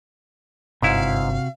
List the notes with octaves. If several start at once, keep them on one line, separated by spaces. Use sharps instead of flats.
G1 G#2 C3 E4 F#4 F5